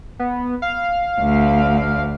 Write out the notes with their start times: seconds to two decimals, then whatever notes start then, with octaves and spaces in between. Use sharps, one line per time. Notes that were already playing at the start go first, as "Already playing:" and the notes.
0.19 B3
0.62 F5
1.20 D2